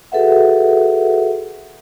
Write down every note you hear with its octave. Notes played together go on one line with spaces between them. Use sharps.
F#4 G#4 A4 B4 E5 F#5